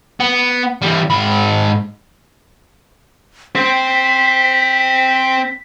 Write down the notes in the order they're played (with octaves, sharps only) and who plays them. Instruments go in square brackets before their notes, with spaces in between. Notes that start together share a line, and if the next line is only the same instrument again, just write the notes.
[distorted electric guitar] B3
E3 G3
G#2 B5
[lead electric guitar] C4 C5 [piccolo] B6